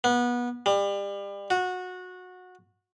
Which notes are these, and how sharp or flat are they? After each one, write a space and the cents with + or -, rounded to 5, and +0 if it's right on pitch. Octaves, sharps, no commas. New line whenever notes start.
B3 -25
G3 +30
F#4 -20